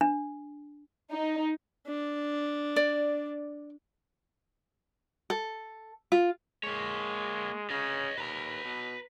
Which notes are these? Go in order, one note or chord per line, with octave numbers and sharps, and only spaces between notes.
D4
D#4
D4
D5
A4
F4
G#3 A#3 C#5
C#3 C#5 D#5
D#2 B4 A#5
B2